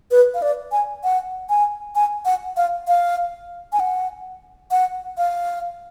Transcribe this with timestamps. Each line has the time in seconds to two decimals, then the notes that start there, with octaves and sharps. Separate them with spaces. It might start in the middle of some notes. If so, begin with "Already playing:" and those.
0.11 B4
0.34 F5
0.42 D5
0.72 G#5
1.04 F#5
1.49 G#5
1.95 G#5
2.25 F#5
2.57 F5
2.88 F5
3.73 G#5
3.80 F#5
4.71 F#5
5.18 F5